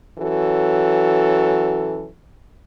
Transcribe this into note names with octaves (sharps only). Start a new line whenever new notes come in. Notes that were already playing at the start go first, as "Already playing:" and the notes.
E3 F#3 C#4 F#4 A4